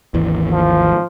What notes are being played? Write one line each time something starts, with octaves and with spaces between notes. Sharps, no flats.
G#1 D#2 E3
F3